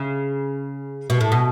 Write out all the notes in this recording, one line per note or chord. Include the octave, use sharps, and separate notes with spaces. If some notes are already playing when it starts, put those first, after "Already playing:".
Already playing: C#3
B2
A2
B2